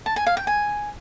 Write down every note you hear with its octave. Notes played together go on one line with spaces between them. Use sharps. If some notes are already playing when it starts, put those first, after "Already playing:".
A5
G#5
F5
G5
G#5